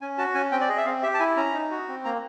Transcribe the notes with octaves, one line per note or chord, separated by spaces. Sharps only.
C#4 G#5
F#4 A5
C#4 G#5
C4 G5
D5
G#4 D#5
E5
C4 F5
G4 E5
A5
E4 G#5
C#4 A#5
D#4
F#4
C4
A#3 A#5